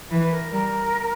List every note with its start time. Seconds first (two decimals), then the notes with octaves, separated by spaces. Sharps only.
0.11 E3 B4
0.32 A#4
0.52 G3 A#4